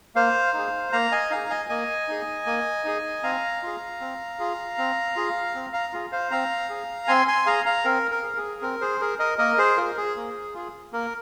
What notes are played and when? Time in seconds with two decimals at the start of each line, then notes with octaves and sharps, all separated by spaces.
0.15 A#3 C5 F5
0.54 D#4 G#4
0.93 A#3 F5 A#5
1.12 D#5 G#5
1.31 D#4 G#4 F5 A#5
1.50 D#5 G#5
1.69 A#3 D#5 G#5
2.08 D#4 G#4
2.46 A#3
2.85 D#4 G#4
3.23 C4 F5 A#5
3.63 F4 G#4
4.01 C4
4.39 F4 G#4
4.78 C4
5.16 F4 G#4
5.55 C4
5.73 F5 A#5
5.93 F4 G#4
6.12 C5 F5
6.31 C4 F5 A#5
6.69 G#4
7.08 C4 G#5 C6
7.28 G#5 C6
7.46 G#4 F5 A#5
7.66 F5 A#5
7.84 C4 A#4
8.11 A#4
8.23 G#4
8.37 G#4
8.62 C4 A#4
8.81 G#4 C5
9.01 G#4 A#4
9.19 A#4 D#5
9.38 A#3 A#4 D#5
9.58 G#4 C5
9.77 F4 G#4 A#4
9.97 G#4
10.16 A#3
10.54 F4 G#4
10.93 A#3 A#4